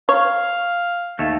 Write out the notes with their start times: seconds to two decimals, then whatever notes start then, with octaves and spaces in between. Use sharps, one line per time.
0.09 C#5 F5
1.19 D#2 A3